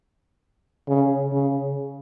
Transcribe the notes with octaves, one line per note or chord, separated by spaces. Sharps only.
C#3
C#3